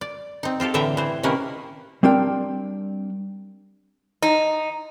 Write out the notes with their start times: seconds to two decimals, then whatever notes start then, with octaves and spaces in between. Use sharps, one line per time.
0.01 D5
0.43 C4 D#4
0.60 C4 F4 G4 A4
0.74 A2 D3 E3 E5 G5 A#5
0.97 E3 C5
1.23 C3 D#3 A#3 C#4 A#4 B4
2.03 G3 C4 D4 A#4 G5
4.22 D#4